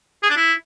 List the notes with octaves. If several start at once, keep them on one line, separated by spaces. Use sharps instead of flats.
G#4
D4
E4